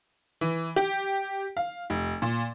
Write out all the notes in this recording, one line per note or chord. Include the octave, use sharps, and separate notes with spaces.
E3
G4
F5
F1
A#2